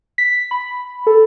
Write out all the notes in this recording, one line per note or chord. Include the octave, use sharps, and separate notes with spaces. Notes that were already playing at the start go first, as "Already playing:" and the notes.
B6
B5
A4